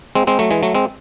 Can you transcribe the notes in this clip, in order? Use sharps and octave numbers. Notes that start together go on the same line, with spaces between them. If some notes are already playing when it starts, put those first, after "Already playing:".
G#3 C4
G#3 C4
F#3 A3
E3 G#3
F#3 A3
G#3 C4